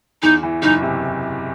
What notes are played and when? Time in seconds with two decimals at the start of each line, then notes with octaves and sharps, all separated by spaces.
0.22 E2 D#4
0.43 E3
0.62 F#1 D#4
0.83 C3